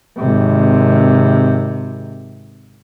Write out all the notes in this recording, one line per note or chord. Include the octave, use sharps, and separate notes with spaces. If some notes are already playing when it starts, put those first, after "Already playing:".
G#1 C3